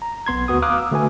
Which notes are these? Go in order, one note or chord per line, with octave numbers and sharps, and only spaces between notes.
A#5
B1 B3 C6 G#6
D2 B3 F#4 D#6
F5 A#5 D6 D#6 F6 F#6
E6
D3 A3 F#4 B4 G#5